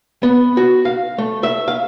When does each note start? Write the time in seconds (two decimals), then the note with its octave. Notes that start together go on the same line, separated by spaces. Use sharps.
0.23 B3
0.57 F#4
0.85 F5
1.18 A3
1.43 E5
1.68 F5